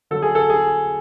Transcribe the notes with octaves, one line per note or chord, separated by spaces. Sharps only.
D3 F#3 A4
G#4
A4
G#4